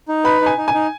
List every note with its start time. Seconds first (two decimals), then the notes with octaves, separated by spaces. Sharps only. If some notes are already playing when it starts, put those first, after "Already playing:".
0.08 D#4
0.24 B4 B5
0.41 D#4
0.46 G#5
0.57 D#4
0.68 G#5
0.73 D#4